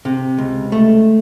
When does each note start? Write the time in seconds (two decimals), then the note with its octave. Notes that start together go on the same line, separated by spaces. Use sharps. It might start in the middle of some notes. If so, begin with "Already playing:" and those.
0.05 C3
0.38 C#2
0.72 A3